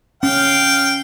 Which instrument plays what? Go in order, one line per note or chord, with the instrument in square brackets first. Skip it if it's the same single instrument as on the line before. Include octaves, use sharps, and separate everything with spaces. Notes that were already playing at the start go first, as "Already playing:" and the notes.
[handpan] C#4 [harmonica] F5 G5